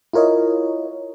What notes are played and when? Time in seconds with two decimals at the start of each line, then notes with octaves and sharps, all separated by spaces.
0.13 E4 F4 A#4 C#5 D#5